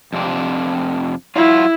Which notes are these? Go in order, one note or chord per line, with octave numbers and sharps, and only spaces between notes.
F2 C3 D4
F#3 E4 F4